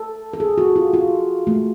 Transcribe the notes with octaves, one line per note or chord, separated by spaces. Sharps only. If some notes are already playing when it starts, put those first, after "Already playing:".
Already playing: A4
A4
G#4
F#4
F4
F4
A3